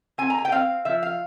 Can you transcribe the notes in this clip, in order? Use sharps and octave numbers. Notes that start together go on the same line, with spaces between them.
C4 G#5
A#5
G#5
G5
C4 F5
F3 E5
F5